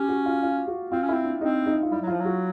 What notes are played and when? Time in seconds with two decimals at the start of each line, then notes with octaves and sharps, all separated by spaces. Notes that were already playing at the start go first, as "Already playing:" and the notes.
Already playing: C#4 G4
0.09 F#4
0.26 F4
0.43 F4
0.67 F#4
0.92 C4 F4
1.02 C#4
1.09 C4 E4
1.25 D4
1.41 C4 D#4
1.66 D#4
1.83 F4
1.91 G3 E4
2.02 F#3
2.07 F3 F4
2.20 F#3
2.25 F#4